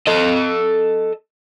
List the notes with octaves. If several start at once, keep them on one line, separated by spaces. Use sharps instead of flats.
A4 D#5